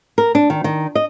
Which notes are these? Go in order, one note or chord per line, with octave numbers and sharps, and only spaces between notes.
A#4
D4
D#3
D#3
D#5